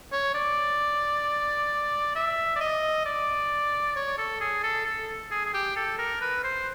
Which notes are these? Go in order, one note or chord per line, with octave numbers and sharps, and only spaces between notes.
C#5
D5
E5
D5
D#5
D5
C#5
A4
G#4
A4
A4
G#4
G#4
G4
A4
A#4
B4
C5